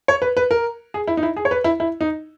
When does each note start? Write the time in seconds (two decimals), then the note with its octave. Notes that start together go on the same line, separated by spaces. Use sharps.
0.08 C#5
0.22 B4
0.37 B4
0.51 A#4
0.94 G#4
1.08 E4
1.17 D#4
1.23 E4
1.37 G#4
1.45 C#5
1.51 B4
1.64 E4
1.80 E4
2.01 D#4